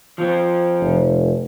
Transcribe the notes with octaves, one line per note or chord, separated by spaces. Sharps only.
F3 C4
F1